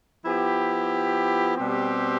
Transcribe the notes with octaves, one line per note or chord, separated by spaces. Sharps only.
F3 B3 E4 G4
B2 G3 C4 G4